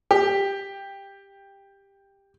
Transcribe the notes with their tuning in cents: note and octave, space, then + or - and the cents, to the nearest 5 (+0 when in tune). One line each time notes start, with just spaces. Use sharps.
G4 +10